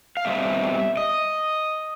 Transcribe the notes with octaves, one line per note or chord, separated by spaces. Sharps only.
F5
B2 G3 C4 E5
D#5